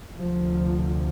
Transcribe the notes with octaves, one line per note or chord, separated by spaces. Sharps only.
D2 C3 F3